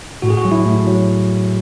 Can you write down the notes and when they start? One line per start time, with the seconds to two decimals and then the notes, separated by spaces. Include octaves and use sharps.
0.22 A2 F#4
0.30 G#4
0.37 F#4
0.45 F#3
0.52 E4
0.66 A2
0.87 F#3